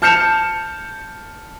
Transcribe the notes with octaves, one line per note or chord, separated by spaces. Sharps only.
A5 F6 G6 C#7 E7 F7